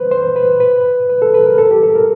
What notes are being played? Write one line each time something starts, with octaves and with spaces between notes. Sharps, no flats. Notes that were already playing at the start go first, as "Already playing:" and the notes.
Already playing: B4 C5
C5
B4
B4
B4
A4
B4
A#4
A4
G4
A4
A#4